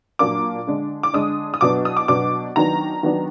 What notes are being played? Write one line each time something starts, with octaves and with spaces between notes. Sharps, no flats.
A#2 F#3 A#3 D4 D6
D3 G#3 D4
D6
D3 G#3 D4 D#6
D#6
B2 F#3 B3 D4 D6
D#6
D6
B2 F#3 B3 D4 D6
D#3 F#3 B3 D4 A#5
D#3 F#3 B3 D4